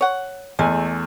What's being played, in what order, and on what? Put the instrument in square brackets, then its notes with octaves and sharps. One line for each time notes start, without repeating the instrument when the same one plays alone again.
[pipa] C#5 F#5
[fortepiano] E2 A3 G#5 [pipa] G#3